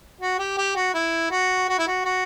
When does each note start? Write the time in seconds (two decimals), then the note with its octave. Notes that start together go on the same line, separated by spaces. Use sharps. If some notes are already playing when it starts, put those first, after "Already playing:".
0.21 F#4
0.39 G4
0.58 G4
0.76 F#4
0.94 E4
1.31 F#4
1.69 F#4
1.79 E4
1.87 F#4
2.05 F#4